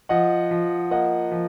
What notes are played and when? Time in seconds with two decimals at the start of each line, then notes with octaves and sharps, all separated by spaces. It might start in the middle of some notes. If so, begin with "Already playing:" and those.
0.09 F3 D#5 F#5
0.51 F3
0.91 A#3 D#5 F#5
1.32 F3